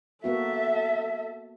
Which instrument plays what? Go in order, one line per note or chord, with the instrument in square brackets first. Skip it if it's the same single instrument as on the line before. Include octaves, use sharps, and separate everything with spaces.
[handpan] A#3 B3 F#4 [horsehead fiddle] A4 E5